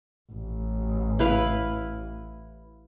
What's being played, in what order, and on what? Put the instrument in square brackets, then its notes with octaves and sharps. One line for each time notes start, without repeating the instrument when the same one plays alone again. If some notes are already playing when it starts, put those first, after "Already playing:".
[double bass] A1
[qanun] E4 B4 F5